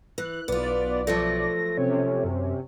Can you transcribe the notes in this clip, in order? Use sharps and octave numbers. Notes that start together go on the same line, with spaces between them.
E3 F#6
B1 B3 F4 B4 D5
F3 F#3 A3 A#6
C3 C#4 C#5
F#2